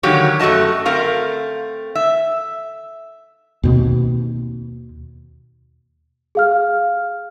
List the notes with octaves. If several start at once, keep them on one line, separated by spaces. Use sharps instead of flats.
D3 D#3 F#3 A#3 G4 C#5
F#2 A3 F#4 D#5 A5
A3 C4 A#4 F5
E5
D#2 B2 C4
G#4 F5 F6